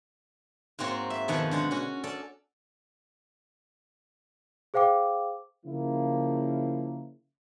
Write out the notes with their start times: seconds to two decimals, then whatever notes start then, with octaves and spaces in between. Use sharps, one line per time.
0.79 G#2 A#3 C4 F#4 C#5
1.10 E5
1.28 F2 B2 D#3 F3 F#5 G#5
1.51 D3 G#3 F#5
1.71 C#4 F#4
2.04 C#4 A4 D5
4.74 G#4 C5 F5 G5 D6
5.66 C#3 F3 A#3 E4